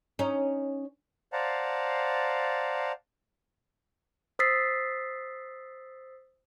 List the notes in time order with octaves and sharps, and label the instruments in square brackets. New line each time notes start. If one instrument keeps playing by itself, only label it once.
[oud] C#4 D#4
[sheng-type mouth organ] C5 D5 F5 F#5 A5 A#5
[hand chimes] C5 D#6 E6 A6 B6 C7